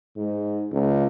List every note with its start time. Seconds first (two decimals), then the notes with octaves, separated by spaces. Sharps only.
0.17 G#2
0.72 C#2